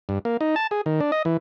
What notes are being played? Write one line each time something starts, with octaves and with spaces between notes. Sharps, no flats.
G2
A#3
D#4
A5
G#4
D#3
D4
D#5
E3